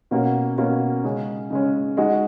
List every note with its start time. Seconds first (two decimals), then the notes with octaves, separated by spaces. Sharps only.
0.11 B2 A#3 C#4 F#4
0.58 B2 A#3 C#4 F#4
1.04 C#3 G#3 C#4
1.50 C#3 G#3 C#4
1.97 G#3 D#4 F#4